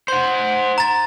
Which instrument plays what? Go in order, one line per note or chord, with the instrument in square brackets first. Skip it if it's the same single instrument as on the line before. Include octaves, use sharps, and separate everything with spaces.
[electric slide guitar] C5 F#5 [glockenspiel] C6
[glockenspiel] A#5 A6